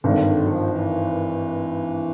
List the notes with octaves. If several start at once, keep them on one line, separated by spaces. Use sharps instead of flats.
G#1 G2 D3 D#3
D3
F#3
F3
E3